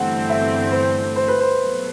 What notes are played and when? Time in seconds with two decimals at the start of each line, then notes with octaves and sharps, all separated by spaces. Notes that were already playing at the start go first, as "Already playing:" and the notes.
Already playing: G1 G2 E3 A3 C4 F#5
0.30 E5
0.72 C5
1.16 C5
1.28 B4
1.40 C5
1.59 B2 F#3 A3